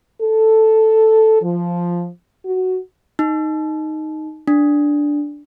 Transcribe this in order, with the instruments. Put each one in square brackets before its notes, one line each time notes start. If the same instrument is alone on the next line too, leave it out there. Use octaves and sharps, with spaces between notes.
[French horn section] A4
F3
F#4
[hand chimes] D#4
D4